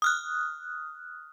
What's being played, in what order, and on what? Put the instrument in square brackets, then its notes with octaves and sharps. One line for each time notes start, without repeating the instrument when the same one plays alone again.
[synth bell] D#6 F6 F#6